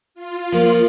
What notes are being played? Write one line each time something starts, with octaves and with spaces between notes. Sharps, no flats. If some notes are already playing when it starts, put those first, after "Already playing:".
F4
F3 A#3